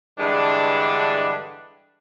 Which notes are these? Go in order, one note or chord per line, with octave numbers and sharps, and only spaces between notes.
G2 D3 E3 G#3 D4